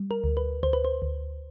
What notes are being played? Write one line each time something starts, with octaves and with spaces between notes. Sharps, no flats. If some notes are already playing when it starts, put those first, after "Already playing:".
Already playing: G3
A#4
D2
B4
D2 C5
B4
C5
D2